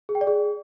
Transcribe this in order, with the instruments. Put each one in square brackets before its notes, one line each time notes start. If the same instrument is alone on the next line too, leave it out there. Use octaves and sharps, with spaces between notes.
[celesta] G#4
G5
D5
G#4